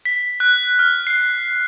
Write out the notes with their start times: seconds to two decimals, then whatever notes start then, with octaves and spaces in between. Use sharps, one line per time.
0.05 B6
0.40 F#6
0.79 F6
1.07 C7